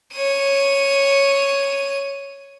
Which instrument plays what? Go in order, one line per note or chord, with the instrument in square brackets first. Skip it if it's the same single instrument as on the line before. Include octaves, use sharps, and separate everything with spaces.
[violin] C#5 D#7